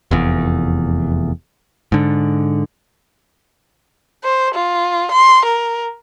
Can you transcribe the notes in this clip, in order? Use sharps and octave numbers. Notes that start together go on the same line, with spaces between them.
F1 E2
G#2 D3
C5
F4
C6
A#4